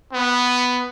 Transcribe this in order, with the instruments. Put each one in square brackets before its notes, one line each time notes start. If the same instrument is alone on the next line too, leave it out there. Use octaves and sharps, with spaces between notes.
[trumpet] B3